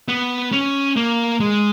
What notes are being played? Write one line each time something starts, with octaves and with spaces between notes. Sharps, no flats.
B3
C#4
A#3
G#3